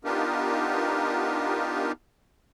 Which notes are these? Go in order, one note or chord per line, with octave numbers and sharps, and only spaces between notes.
B3 D4 D#4 F4 G4 A#4